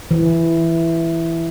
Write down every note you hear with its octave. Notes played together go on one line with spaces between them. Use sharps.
E3